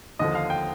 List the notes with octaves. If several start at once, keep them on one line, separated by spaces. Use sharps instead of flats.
D#2 D3 F3 D#5
F5
G5